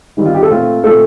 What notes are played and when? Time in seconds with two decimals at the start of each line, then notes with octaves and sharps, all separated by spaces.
0.17 D#3 G3 C4
0.26 F4
0.34 G4
0.42 A4
0.51 A#2 A3 C4 F4
0.84 A#2 A3 C4 A4